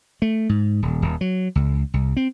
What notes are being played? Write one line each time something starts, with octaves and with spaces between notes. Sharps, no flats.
A3
G#2
D#1
D#1
F#3
C#2
C2
C4